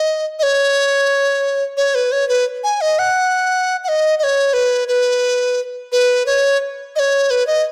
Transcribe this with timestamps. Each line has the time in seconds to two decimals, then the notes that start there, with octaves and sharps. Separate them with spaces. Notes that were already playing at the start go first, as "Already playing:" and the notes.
Already playing: D#5
0.39 D#5
0.43 C#5
1.77 C#5
1.95 B4
2.12 C#5
2.29 B4
2.64 G#5
2.81 D#5
2.99 F#5
3.84 F#5
3.88 D#5
4.19 D#5
4.23 C#5
4.53 B4
4.88 B4
5.92 B4
6.26 C#5
6.96 D#5
6.99 C#5
7.30 B4
7.47 D#5